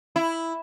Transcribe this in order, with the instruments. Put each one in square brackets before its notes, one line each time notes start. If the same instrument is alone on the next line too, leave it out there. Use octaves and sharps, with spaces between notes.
[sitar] E4